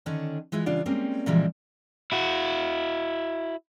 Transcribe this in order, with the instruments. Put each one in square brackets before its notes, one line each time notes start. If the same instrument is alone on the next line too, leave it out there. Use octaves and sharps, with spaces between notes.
[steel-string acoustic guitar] D3 D#3 C#4 D4
E3 G#3 E4 F4
C#3 E3 G3 D4 F4
G3 G#3 A#3 C4 C#4
A#2 C#3 E3 F3 G3 G#3
[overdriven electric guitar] E4 F#4